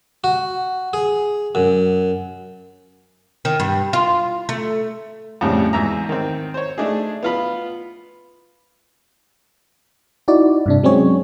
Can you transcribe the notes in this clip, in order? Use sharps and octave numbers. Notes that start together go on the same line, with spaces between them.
F#4
G#4
F#2
D#3
G2
F4
A3
F2 A2 C#3 G3 C4 D4
E2 G#2 E5 A#5
D#3 C4
C5 C#5
A3 D4 D#4 G#4
B3 F4 B5
D#4 E4 F#4 D5
G2 C3 D4
F#3 G#3 C4 C#4 G#4 C#5